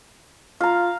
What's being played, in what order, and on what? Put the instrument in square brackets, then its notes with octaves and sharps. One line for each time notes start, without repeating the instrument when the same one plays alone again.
[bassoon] F4 [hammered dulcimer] F5 A#5